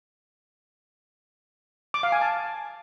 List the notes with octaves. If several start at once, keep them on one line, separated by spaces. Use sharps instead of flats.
D6
F5
G#5
A5